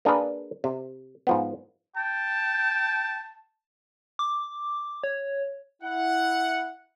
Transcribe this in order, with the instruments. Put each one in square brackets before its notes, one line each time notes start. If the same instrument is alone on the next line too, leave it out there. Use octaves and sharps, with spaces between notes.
[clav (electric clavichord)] A#3 D4 G#4 A#4 B4
C3
G#2 F3 B3
[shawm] G5 [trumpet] A5
[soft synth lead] D6
C#5
[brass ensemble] E4 F#5